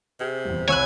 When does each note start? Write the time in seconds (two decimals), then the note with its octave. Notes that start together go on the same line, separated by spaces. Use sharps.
0.20 C3 G#4
0.45 D#1 E2
0.68 C2 C#5 G#5 B5 E6 F#6